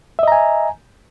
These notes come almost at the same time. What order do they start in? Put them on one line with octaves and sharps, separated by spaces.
E5 D#5 A#5 G#5